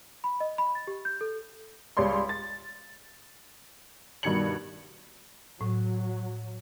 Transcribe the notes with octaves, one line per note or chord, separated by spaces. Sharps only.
B5
D#5
B5
A6
G4
G6
A4
C#2 G3 C#5 D5 C6
A6
G2 B2 D#3 G#6 C#7 F#7
A2 F#3